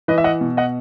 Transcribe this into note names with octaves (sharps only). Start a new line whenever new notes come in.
E3 B4 D#5
E5
D#5 F#5
B2
D#5 F#5